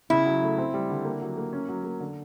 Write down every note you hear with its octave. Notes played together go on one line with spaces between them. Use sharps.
C#3 E4
F#3
A3
C4
G3
D3
A#3
F#3
A#3
C#4
F#3
A#3
D3